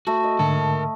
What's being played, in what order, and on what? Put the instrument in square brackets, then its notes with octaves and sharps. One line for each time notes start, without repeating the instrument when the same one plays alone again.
[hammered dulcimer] A3 [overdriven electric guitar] F#4
[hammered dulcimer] D#5
[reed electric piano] G#2 D3 [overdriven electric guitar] A#4 A5